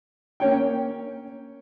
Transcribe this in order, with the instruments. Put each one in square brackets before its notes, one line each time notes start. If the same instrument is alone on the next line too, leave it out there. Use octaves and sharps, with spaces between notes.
[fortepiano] A#3 C#4 C#5 G5